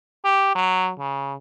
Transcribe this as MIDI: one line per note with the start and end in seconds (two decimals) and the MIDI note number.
0.25 0.51 67
0.55 0.90 54
0.99 1.34 49